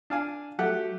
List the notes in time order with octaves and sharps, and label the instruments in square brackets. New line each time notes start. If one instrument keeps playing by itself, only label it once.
[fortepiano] D4 F5 G#5
[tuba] F#3 [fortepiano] A3 G4 F#5